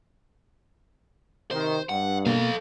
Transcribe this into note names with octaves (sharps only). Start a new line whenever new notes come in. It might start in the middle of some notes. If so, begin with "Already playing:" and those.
C3 D#3 C5
G2 F#5
B2 A#3 A4 F5